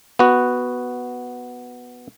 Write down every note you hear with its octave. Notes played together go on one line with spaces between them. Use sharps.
B3 F#4